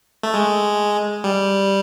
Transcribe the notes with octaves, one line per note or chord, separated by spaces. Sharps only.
A3
G#3
G3